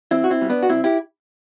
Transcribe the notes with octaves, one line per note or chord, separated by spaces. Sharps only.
E2 C4 E4
F#4
C4 E4
B2 G3
B3 D4
F#4
C2 C4 E4
E4 G4